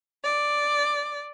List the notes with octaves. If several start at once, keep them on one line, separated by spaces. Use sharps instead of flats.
D5